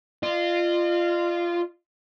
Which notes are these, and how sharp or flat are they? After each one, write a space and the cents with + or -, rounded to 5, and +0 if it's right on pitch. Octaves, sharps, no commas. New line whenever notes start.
F4 -15 D#5 -45